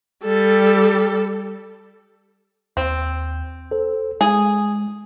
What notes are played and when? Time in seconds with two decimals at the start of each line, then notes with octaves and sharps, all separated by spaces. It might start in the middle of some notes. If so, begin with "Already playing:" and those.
0.25 G3 A4
2.77 D#2 C4
3.71 A4 C5
4.21 G#3 G#4